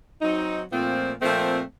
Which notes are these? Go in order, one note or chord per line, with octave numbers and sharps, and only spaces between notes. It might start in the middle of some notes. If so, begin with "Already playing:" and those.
F#3 C4 D#4
A#2 F3 A3 C4
A#2 F3 A3 C4